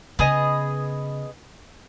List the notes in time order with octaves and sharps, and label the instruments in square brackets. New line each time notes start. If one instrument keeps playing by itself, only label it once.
[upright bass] C#3 [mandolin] B3 G#4 D#5